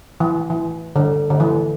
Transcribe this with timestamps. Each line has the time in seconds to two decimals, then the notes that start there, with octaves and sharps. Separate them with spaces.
0.20 E3
0.50 E3
0.96 D3
1.30 D3
1.40 E3